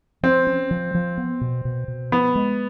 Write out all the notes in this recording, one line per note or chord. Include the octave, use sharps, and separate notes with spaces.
F3 C4
C#4
F3
F3
B3
B2
B2
B2
F3 B3
G#3